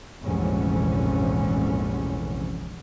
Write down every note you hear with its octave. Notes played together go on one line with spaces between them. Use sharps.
F1 A#1 G#2 D3 E3 C#4